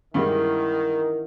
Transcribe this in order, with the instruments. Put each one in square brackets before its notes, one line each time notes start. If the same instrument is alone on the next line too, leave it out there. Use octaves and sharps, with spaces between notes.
[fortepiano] G2 G3 G#3 [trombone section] D#3 [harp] E3 C#4 F#5 [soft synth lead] A#4